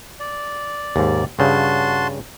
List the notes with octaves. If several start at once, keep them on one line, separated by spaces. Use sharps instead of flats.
D5
D#2 G#2
G2 C#3 F#4 A5 C6